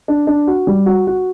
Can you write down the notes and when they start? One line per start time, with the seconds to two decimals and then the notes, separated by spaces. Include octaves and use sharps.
0.08 D4
0.27 D4
0.47 F#4
0.67 G3
0.86 F#4
1.07 F#4